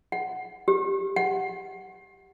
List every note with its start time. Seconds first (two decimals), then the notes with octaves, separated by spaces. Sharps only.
0.12 F#5
0.68 G4
1.16 F#5